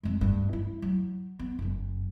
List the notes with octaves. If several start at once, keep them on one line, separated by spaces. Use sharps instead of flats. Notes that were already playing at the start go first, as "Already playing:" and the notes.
F2 G#3
D2 G2
E4
F#3
B3
F#1 F#2